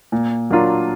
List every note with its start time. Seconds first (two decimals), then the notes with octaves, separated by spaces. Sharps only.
0.12 A#2
0.50 F#3 A#3 D4 F4